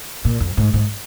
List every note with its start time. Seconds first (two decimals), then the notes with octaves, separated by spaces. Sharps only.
0.25 A#2
0.40 F2
0.57 G#2
0.74 G#2